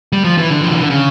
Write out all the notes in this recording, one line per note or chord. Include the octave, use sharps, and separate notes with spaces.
G3
F3
E3
D3
F3
E3
D3
C#3